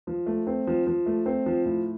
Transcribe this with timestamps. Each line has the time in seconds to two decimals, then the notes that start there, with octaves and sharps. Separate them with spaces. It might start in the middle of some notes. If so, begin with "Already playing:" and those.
0.07 F3
0.26 A3
0.47 C4
0.67 F3
0.87 F3
1.06 A3
1.26 C4
1.46 F3
1.65 A2